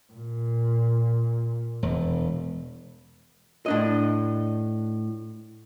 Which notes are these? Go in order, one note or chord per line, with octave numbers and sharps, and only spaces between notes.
A#2
E1
A2 D4 D#5